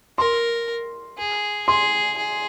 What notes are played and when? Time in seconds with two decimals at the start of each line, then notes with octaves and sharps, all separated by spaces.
0.18 A#4 C6
1.18 G#4
1.68 G#4 C6
2.17 G#4